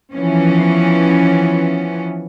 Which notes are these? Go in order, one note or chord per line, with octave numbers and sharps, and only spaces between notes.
E3 F3 B3 C#4